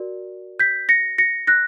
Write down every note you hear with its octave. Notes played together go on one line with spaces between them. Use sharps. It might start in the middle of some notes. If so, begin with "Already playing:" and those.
Already playing: F#4 A#4 D5
G6 B6
A#6 C#7
A#6 C#7
F#6 A#6